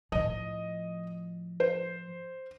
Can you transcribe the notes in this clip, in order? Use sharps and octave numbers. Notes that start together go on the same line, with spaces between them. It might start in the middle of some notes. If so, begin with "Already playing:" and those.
A2 F3 D#5
C5